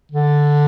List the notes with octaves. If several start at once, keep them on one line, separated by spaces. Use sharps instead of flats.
D3